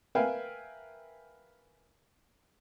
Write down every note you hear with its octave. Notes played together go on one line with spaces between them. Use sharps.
A#4 B4 E5 F5 G5 G#5